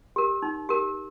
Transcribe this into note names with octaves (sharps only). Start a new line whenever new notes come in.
G4 A#4
D#4
G4 A#4